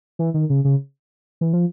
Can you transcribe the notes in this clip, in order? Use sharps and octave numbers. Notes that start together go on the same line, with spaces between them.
E3
D#3
C#3
C#3
E3
F3